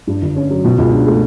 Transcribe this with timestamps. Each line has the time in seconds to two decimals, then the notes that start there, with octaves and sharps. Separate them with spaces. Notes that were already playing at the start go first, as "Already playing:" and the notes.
0.07 G2
0.22 G1
0.36 C#4
0.50 F#3
0.64 B2
0.78 C#2
0.92 D4
1.07 A3